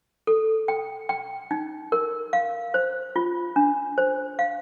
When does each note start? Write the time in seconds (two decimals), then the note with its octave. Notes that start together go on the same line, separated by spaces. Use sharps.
0.27 A4
0.68 G5
1.09 G5
1.51 D#4
1.92 A#4
2.33 F5
2.74 C5
3.16 F4
3.56 D4
3.98 C5
4.39 F5